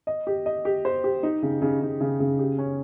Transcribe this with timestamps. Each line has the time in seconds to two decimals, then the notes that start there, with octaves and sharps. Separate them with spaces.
0.07 D#5
0.27 G4
0.46 D#5
0.65 G4
0.85 C5
1.04 G4
1.23 D#4
1.42 C#3
1.62 C#3
1.82 C#3
2.01 C#3
2.20 C#3
2.39 G4
2.58 C#4